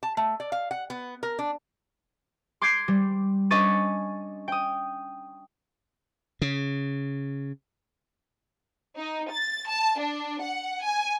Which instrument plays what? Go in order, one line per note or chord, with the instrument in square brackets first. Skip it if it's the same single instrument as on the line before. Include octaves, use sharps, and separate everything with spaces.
[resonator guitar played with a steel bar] A5
A3
D5
F5
F#5
B3
A#4
D4
[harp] C6 D6 G6 G#6 C7 D7
G3
C#4 D4 D#5 C#6 A6 D#7
G5 D#6
[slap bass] C#3
[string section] D#4
A6
A5
D4
F#5
G#5